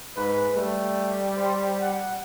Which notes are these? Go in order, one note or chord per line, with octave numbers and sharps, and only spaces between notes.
G#2 B4
G3 A3
C5
F#5